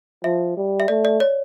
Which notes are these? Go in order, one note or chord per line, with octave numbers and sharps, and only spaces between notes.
F3 E5
G3
E5
A3 D5
D5
C#5